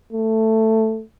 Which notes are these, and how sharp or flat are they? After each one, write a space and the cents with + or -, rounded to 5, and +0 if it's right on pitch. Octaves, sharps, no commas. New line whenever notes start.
A3 +10